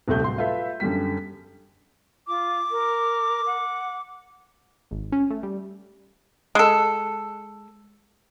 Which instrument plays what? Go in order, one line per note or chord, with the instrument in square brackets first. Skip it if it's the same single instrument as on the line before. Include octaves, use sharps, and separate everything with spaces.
[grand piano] D#1 C3 A3 G6
D1 C6
F4 A4 B4 E5
F#2 D3 G3 B6
[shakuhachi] F4 [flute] D6
[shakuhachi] A#4
F#5
[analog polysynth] G#1
C#4
A3
G3
[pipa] G#3 A4